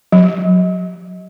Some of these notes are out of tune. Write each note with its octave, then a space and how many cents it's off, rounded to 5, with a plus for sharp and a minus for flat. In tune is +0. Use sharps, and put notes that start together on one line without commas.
F#3 -20